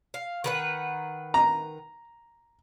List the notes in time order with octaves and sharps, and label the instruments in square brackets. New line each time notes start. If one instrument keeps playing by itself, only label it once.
[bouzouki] F5
D#3 B4 F#5
[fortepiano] A#5